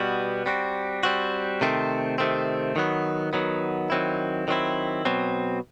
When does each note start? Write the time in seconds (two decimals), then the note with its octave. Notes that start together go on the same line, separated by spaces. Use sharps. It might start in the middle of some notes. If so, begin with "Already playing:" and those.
Already playing: B2 G3 B3 F#4
0.46 G3 C4 F#4
1.03 G3 C4 F#4
1.61 C3 D#3 A3 C4
2.18 C3 D#3 A3 C4
2.76 D#3 F#3 B3
3.33 D#3 F#3 B3
3.90 D#3 F#3 C4 E4
4.48 D#3 F#3 C4 E4
5.05 B2 F#3 C4